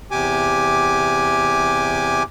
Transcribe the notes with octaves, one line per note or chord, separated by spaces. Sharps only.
E2 C3 G4 G#5 D6